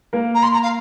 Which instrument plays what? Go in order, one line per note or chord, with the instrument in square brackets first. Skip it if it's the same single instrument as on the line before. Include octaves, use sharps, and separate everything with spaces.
[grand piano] A#3 A#4
[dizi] A#5
C6
A#5
F5